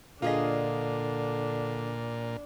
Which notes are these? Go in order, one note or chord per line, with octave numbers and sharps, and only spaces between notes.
A#2 D3 D4 F4 G#4 D#5